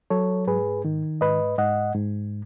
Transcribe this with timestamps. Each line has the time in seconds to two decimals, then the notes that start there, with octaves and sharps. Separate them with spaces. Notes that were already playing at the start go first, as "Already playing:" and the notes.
0.10 F#3 A4 C#5
0.47 G#2 G#4 B4
0.85 D#3
1.21 G#2 B4 D#5
1.58 G#2 D#5 F#5
1.95 G#2